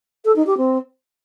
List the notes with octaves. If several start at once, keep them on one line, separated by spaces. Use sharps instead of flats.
A4
D#4
G4
C4